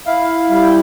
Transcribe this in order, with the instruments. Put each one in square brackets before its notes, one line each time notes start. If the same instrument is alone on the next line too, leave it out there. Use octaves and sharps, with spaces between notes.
[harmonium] E4 F5
G3 F5
G5